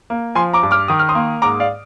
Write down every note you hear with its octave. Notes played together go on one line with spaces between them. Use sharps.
A#3
F3 G#5 C6
A#5 D6
G2
D6 F6
D#3 D#6
F6
C6 D#6
A#3
G#2 A#5 D6
D5 F5